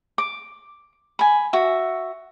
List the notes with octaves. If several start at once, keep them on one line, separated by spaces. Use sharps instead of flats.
D6
G#5 B5
F#4 E5